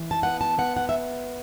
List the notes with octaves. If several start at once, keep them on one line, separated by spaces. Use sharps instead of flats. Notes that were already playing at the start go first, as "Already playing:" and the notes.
Already playing: E3
A5
B3 F#5
A5
B3 F#5
F#5
E5